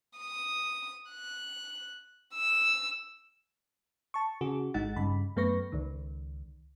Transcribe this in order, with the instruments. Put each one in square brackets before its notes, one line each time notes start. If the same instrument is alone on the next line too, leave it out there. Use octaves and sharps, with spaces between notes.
[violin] D#6
F#6
E6
[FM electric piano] A5 C#6
C#3 F#4 G#4
G#1 G#3 D#4 F#5 A6
G2 C#3 B5
F#2 A3 B3 B4 C#6 A#6
C#2 D#3